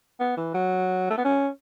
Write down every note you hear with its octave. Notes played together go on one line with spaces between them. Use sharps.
B3
E3
F#3
A3
B3
C#4